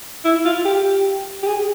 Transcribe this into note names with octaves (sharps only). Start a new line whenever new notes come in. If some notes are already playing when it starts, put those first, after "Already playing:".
E4
F4
G4
G4
G#4